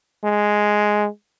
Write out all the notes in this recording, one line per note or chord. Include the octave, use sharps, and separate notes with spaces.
G#3